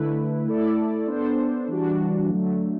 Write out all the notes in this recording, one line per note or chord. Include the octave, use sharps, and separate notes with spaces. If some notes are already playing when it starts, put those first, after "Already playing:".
Already playing: D3 A3 E4 B4
A3 E4 A4 D5
B3 D4 A4 C5
E3 G3 D4 F#4
D3 F#3 A3